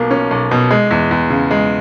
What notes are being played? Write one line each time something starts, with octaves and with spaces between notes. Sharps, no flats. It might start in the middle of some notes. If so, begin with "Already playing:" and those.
Already playing: B1 B2 A#3
C#4
B1
B2
G#3
E2
E2
C#3
G#3